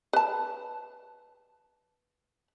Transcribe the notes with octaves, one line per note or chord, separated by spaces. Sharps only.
B4 A5